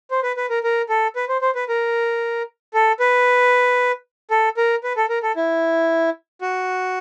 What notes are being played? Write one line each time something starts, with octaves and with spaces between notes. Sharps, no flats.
C5
B4
B4
A#4
A#4
A4
B4
C5
C5
B4
A#4
A4
B4
A4
A#4
B4
A4
A#4
A4
E4
F#4